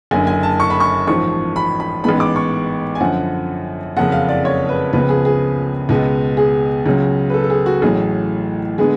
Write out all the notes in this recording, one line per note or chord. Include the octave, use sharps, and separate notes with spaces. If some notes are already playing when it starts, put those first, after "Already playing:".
F#1 F#2 D3 G#5
G#5
A5
C#6
B5
C#6
A1 G#2 F3 C#6
B5
B5
A1 G#2 G#3 B3 B5
D6
C#6
G#5
F#2 D3 F3 F#5
F#1 F2 C#3 F#5
F5
D5
C#5
B4
C#2 C#3 F3 B3 B4
G#4
G#4
C#2 B2 G#3 B3
G#4
C#2 C#3 F#3
B4
A4
A4
G#4
F#4
A1 A2 F#3 G#4
D3 G#3 B3 G#4